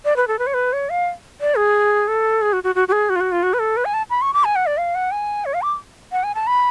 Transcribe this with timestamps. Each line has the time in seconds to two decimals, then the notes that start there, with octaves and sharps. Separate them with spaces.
0.05 D5
0.16 B4
0.28 A4
0.39 B4
0.47 C#5
0.54 B4
0.73 C#5
0.90 F5
1.41 D5
1.57 G#4
2.08 A4
2.42 G#4
2.53 F#4
2.64 F#4
2.75 F#4
2.88 F#4
2.92 G#4
3.09 F#4
3.16 F4
3.20 F#4
3.32 F4
3.43 F#4
3.53 B4
3.59 A4
3.77 B4
3.85 G#5
3.94 A5
4.10 B5
4.22 C#6
4.33 D6
4.44 G#5
4.56 F#5
4.66 D5
4.77 F5
4.95 F#5
5.11 G#5
5.45 C#5
5.54 F5
5.62 D6
6.12 F#5
6.24 G#5
6.35 A5
6.47 B5